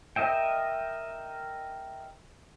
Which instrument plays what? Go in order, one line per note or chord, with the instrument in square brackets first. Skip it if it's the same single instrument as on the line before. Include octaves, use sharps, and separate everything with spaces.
[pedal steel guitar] A#4 D#5 E5 G5